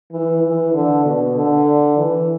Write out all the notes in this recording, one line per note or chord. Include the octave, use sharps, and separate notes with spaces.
E3
E3
D3
B2
D3
E3